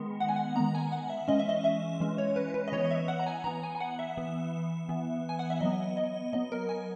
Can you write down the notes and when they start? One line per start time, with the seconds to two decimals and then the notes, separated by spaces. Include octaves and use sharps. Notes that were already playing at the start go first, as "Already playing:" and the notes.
Already playing: D#3 G#3 B3
0.20 F#5
0.29 G#5
0.36 F#5
0.55 D#3 G#3 B3 A#5
0.75 G#5
0.92 F#5
1.10 E5
1.28 E3 G#3 C#4 D#5
1.39 E5
1.49 D#5
1.64 E5
2.00 E3 G#3 C#4
2.18 C#5
2.36 B4
2.54 B4
2.68 D#5
2.72 E3 B3 C#5
2.85 D#5
2.91 E5
3.08 F#5
3.19 A#5
3.27 G#5
3.44 E3 B3 A#5
3.63 G#5
3.75 G#5
3.80 F#5
3.99 E5
4.17 E3 B3
4.89 E3 B3
5.29 G#5
5.39 F#5
5.50 E5
5.60 F#3 B3 D#5
5.97 D#5
6.33 F#3 B3 D#5
6.52 A#4
6.69 G#5